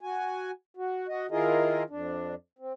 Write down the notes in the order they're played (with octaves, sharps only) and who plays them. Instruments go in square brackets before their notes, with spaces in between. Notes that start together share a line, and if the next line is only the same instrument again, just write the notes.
[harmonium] F#4 G#5
F#4
F#4 D#5
D#3 E4 F4 G#4 A#4 D#5
F2 D4
C4